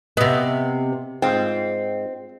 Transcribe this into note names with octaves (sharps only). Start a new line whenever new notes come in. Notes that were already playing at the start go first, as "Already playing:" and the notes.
C3 B3 D#5 E5
G#2 C4 F4